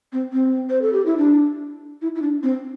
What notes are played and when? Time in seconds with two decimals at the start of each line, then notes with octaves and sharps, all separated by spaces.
0.13 C4
0.33 C4
0.70 C5
0.82 A4
0.93 G4
1.06 E4
1.18 D4
2.02 E4
2.15 E4
2.22 D4
2.43 C4